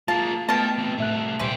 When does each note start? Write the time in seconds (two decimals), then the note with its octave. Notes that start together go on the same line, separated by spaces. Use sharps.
0.08 G#3 A#3 F4 F5 A5
0.49 B2 A3 B3 D#5 G5 A5 F6
0.78 E3 C4
0.98 C2 A2 A3 E5 F#6
1.39 D2 A#2 E3 G3 C#4 B4 C5 G5